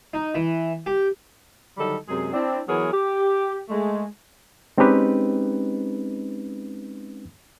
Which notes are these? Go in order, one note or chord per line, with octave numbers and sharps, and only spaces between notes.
D#4
E3
G4
D3 D#3 F#3 G3 D#4 A4
F#2 C3 G#3 G#4
C4 D4 E4
E3 F#3 B3 G#4 A#4 C#5
G4
G#3 A3
G#3 C4 C#4 D#4 G4 B4